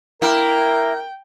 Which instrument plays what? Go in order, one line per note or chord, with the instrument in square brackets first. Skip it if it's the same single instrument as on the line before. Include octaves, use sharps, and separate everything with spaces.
[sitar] A#3 E4 [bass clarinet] A#4 [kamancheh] G5